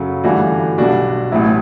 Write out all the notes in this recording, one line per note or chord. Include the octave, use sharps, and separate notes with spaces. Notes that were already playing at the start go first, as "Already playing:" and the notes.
Already playing: F#2 C#3 F#3 A4
G1 G2 E3 A3 D4 F#4
B1 B2 G3 D4 F#4
A1 A2 F#3 E4